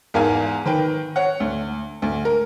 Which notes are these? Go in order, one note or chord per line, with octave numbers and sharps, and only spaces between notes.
E2 G#2 A#4 F5 G#5
D#3 B4 G5
C#5 F#5
D2
D2
A#4